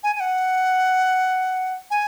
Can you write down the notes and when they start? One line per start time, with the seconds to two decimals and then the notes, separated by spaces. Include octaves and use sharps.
0.03 G#5
0.15 G#5
0.20 F#5
1.91 G#5